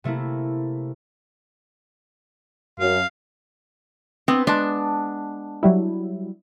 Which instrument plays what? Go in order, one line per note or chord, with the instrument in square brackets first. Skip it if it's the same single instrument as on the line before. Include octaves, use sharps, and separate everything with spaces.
[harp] C3 A3 A#3 E4
[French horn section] F#2 [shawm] F5
[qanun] B3 [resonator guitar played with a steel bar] C4
[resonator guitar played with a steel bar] G#3 A5 [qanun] D4
[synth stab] F#3 G3 E4